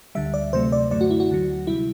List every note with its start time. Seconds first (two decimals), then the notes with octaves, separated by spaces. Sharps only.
0.15 D2 D3 G3 E5
0.34 D5
0.53 D2 C3 F#3 A3 C5
0.72 D5
0.91 F#2 D3 F#3 A3 D5
1.01 F#4
1.10 E4
1.20 F#4
1.29 D2 D3 F#3
1.67 C3 G3 E4